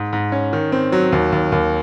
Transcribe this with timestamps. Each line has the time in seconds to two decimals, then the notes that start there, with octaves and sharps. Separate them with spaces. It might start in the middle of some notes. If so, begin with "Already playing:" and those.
Already playing: G#2
0.13 G#2
0.32 C#4
0.53 D#3
0.72 C4
0.92 F#3
1.12 D#2
1.32 D#2
1.52 D#2